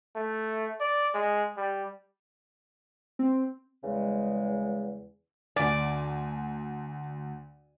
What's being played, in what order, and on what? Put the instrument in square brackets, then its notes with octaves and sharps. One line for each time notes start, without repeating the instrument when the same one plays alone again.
[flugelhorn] A3
D5
G#3
G3
[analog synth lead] C4
[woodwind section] E2 C#3 G3 G#3
[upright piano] D2 G#5 [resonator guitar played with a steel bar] D5